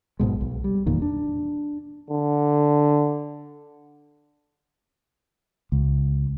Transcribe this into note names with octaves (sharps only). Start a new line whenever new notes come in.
A#1 G#2 B2 G#3
B1
G3
F1 E2 A#2 D#3
D4
D3
C#2